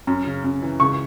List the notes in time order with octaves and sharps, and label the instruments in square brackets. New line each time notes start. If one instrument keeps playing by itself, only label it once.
[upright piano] F#2
C#3
F#2
E3
C#2 C#6